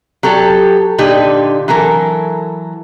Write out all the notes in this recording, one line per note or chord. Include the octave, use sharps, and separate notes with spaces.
F#3 G4 A4
A#2 D3 D#4 G4
E3 F#3 A4 A#4